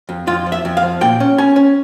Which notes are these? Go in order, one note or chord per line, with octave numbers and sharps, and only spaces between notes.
F2
F2 F4
F3
E5
F2
F5
F3
A#2 G5
C#4
C#4 G#5
C#4